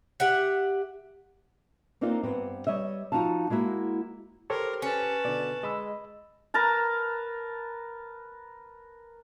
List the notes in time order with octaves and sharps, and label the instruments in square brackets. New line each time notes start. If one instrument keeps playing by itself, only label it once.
[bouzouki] G4 E5 F#5
[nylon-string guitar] A#3 C4 D4 D#4 F4 A#4
G2 B3 C4
G3 C#5 D#5 E5
F3 F#3 D#4 F#4 F5 A5
G#3 A#3 E4 F#4
[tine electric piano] G4 C6 [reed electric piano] A4 C5 C#5 [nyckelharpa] A#4
[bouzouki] C#4 [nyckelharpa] B4 A5
[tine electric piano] B2 D3 [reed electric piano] D5
[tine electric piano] G#3 [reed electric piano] D#5 B5 E6
[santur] A#4 B4 A5 A#5